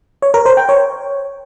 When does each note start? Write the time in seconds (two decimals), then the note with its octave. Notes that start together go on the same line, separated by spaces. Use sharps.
0.22 C#5
0.34 A#4
0.46 C5
0.57 G5
0.69 C#5